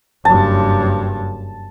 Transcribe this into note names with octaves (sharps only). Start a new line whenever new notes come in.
F#1 G2 A5